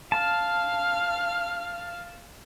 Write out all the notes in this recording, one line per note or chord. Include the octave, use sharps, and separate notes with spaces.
F5 A5 F6